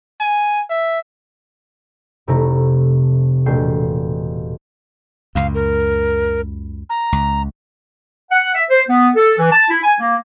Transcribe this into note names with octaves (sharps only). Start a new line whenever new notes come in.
G#5
E5
F1 C3 A3 E4 A#5
E1 A#2 A3 G5 C7
C#2 F#2 F5
A#4
A#5
C#2
F#5
E5
C5
B3
A4
E3
A5
E4
G#5
A#3